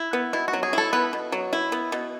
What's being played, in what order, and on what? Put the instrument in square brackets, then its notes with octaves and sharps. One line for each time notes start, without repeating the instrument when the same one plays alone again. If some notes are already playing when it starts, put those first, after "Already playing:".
Already playing: [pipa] E4
B3
[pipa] B2 [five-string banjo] E4
[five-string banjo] F#4
[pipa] F#3
[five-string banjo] G#4
[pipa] E4 [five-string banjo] A4
[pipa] B3 [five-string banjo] B4
[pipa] B2
F#3
E4
B3
B2